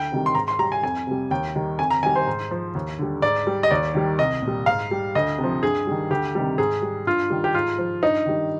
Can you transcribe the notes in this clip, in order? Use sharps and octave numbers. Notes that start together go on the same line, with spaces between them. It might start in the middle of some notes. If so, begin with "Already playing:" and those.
Already playing: D2 G5
C3 D#3 G3
C6
G#2 A#5
C6
G3 A#5
G#5
F2 G#5
C3 G3
D#2 G5
D#3 G3
F2 G#5
A#5
D#3 G3 G#5
C5
G#2
F3
D#2
D3 G3
G#2 D5
G3
D#5
D#2 D5
D#3 G3
C2 D#5
A#2
G3
G#2 F5
G3
D2 D#5
C3
F3
G2 G#4
D#3 G3
D2 G4
C3 D#3 G3
G#2 G#4
G3
G2 F4
D#3 G3
G4
G#2 F4
F3
G2 D#4
D#3 G3